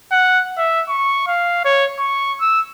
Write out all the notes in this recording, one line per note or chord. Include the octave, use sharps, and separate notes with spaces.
F#5
E5
C#6
F5
C#5
C#6
E6